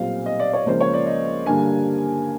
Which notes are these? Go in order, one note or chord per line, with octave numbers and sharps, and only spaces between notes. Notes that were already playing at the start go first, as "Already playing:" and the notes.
Already playing: B1 A#2 G3 C4 F5
D#5
D5
C#5
C#2 C#3 F3 A#3 C5
C#5
D5
D#5
G2 D3 G3 A#3 D4 G#5